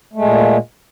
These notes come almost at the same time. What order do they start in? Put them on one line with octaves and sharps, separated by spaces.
A3 G#3 A#2